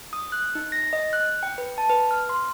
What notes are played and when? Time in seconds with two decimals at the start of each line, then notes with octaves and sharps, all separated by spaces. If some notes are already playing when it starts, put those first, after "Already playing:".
0.13 D#6
0.32 F#6
0.55 D#4
0.72 A#6
0.93 D#5
1.13 F#6
1.43 G5
1.58 B4
1.78 A5
1.89 B4
2.11 F6
2.29 C6